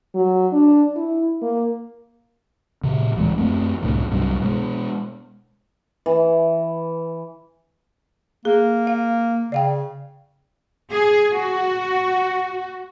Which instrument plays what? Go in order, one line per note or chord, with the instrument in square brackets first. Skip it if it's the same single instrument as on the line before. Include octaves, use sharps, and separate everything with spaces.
[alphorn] F#3
D4
E4
A#3
[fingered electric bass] A#2 C#3
D1 E3 G3 G#3
F#2 F3 A3 C4
C2 F#2 A2 D3
C2 G2 C3 F#3
B2 G#3
[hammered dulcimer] E3
[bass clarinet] A#3 [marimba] G#4
[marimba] F5
[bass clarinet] C#3 [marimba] D5 F5 G5
[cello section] G#4
F#4